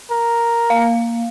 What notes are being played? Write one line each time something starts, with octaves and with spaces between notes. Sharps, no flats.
A#4
A#3 F5